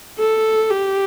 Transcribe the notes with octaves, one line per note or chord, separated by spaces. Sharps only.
A4
G4